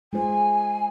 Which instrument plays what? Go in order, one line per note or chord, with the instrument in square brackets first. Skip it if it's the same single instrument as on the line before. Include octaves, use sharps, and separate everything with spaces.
[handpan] G#3 F4 C5 [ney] G#5